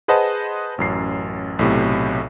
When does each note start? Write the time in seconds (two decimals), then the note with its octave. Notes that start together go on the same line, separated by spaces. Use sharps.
0.08 G#4 B4 C5 D#5 F#5 A5
0.78 A1 F#2 C7
1.59 B1 A2 C3